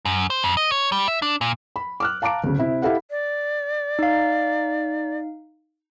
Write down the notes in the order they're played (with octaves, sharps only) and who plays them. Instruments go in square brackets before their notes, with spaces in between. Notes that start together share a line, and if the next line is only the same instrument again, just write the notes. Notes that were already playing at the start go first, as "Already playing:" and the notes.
[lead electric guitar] F#2
C5
F2
D#5
C#5
G3
E5
D4
A#2
[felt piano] B5
D6 F6 F#6
F5 A5 A#5 D6 D7
D2 C#3
C3 E4
E4 G4 A4 F5 F#5
[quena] D5
[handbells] D#4 F5